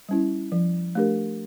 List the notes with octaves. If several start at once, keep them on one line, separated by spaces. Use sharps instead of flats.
G3 C#4 E4
F3
A3 D4 G4 A#4